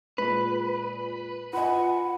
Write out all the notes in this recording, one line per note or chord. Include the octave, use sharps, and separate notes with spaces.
A#2 G#3 B4
F4 B4 D#5 F#5 G#5